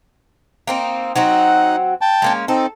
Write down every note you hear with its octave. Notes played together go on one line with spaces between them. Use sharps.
A#3 C4 D#4
F#3 C4 D#4 F#4 F#5
G5 A5
G#3 A#3 C#4
C4 D#4 A4